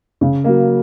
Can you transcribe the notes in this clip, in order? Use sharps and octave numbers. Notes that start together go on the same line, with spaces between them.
C#3
F#3 A#3